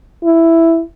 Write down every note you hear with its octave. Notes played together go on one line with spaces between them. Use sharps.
E4